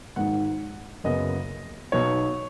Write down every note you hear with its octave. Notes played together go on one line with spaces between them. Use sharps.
G#1 G#2 D#3 F#5
F#1 F#2 C#3 B3 D#5
B1 B2 B3 D#4 C#5